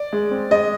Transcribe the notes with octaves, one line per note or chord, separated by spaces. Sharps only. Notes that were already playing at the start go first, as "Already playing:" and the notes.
Already playing: D5
G#3
C4
G#3 D#5